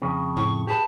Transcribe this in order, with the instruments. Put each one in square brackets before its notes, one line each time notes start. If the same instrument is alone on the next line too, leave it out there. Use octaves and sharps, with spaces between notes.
[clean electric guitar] F2 C#3
[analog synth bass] A2 [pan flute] C#6
[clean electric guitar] G4 G#4 B4 [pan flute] A5